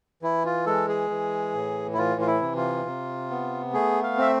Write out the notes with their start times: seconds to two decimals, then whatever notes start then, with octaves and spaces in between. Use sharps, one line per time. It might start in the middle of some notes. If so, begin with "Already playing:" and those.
0.22 E3 E4
0.45 F4
0.66 G#3 A4
0.89 G#4
1.10 E3
1.55 A2
1.93 E4
1.98 E3 F4
2.21 F4
2.27 E4
2.41 C3
2.57 F4
2.86 C3
3.30 B3
3.73 A3 G#4
4.03 F5
4.17 C4 E5